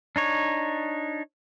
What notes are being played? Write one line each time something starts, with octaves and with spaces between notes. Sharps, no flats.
D4 D#4 C#5